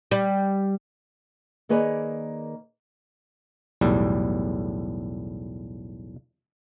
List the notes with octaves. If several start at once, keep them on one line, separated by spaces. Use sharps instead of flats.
G3
D#3 A#3 G#4 B4 C#5 D5
B1 E2 A2 G3